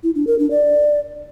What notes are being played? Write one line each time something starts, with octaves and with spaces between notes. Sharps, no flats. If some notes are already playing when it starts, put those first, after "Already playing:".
E4
D4
A#4
D4
D5